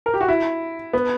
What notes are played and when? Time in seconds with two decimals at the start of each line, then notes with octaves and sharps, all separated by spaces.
0.06 A#4
0.14 G4
0.21 F#4
0.28 E4
0.93 B3